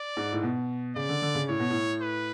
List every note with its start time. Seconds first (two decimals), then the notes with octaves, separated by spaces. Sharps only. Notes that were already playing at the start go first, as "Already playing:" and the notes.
Already playing: D5
0.17 G#2
0.32 A2
0.43 B2
0.96 C#3 D5
1.09 D3
1.22 D3
1.35 C#3
1.49 A2 C#5
1.60 B2
1.70 A2
2.02 B4